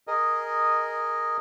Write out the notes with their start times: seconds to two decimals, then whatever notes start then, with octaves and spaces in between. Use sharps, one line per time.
0.07 G#4 A#4 D#5